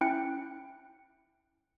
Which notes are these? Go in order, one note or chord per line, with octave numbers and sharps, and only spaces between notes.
C#4 E4 G5 F#6 C#7